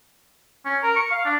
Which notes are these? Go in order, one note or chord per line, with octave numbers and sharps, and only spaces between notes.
C#4
A#4
C#6
F5
D4